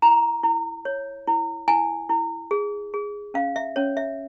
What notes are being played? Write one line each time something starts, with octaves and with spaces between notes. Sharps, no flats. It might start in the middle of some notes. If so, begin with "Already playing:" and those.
E4 A#5
E4
C#5
E4
E4 G#5
E4
G#4
G#4
C#4 F5
E5
C#4 C#5
E5